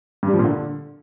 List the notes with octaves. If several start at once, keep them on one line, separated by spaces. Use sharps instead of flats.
G2
G3
F3
A#2
D3